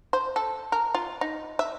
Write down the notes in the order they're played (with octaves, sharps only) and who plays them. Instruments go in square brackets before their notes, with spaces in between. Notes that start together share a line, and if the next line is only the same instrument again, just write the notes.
[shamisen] C5
A4
A#4
F4
D#4
E5